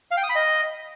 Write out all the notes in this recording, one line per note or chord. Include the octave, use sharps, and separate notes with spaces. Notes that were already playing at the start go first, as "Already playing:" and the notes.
F5
G5
D#6
B5
D#5